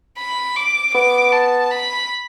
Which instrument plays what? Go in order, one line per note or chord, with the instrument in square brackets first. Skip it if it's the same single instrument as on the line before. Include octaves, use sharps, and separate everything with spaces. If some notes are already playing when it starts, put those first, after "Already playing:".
[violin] B5
D6
[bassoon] B3 [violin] D6
[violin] A5
B5